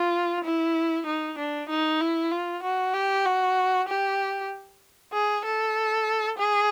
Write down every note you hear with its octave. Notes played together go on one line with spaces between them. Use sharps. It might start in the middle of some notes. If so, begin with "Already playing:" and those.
Already playing: F4
E4
D#4
D4
D#4
E4
F4
F#4
G4
F#4
G4
G#4
A4
G#4